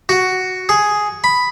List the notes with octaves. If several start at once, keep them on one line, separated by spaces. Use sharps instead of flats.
F#4
G#4
B5